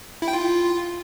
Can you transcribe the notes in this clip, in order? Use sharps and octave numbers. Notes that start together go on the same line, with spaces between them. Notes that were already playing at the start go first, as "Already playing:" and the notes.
E4
G5
F4